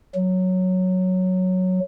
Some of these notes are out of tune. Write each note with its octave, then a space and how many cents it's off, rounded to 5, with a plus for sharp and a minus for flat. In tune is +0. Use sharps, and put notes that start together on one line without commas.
F#3 -5